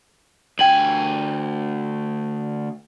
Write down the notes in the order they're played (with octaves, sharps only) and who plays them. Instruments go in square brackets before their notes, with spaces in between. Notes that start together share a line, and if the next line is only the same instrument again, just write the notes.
[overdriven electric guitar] D2 G#5 [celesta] G5 F#7